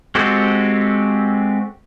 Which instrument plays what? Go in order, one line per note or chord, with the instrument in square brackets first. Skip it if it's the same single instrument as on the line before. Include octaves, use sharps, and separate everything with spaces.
[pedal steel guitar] G#3 C4 F#4 G4 A4